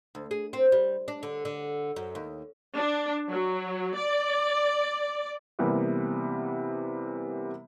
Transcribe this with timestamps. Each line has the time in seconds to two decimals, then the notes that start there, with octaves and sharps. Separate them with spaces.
0.15 D2
0.31 G#4
0.53 C4
0.72 G3
1.08 D4
1.23 D3
1.45 D3
1.96 F#2
2.15 D#2
2.76 D4
3.30 F#3
3.96 D5
5.59 C3 E3 G3 A#3 B3